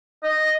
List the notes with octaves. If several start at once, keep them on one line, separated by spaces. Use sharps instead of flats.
D#5